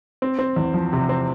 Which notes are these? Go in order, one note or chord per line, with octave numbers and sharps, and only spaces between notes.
C4
C4
E2
F3
C3
C4